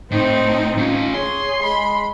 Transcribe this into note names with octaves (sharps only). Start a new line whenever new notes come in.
A2 C4 D#4 C5
A3 C#4 F4
G#4 C#5 C6
G#3 B5